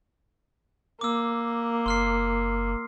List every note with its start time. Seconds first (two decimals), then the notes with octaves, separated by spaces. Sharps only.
1.01 A#3 D6 E6
1.86 F#1 C6 F6 C7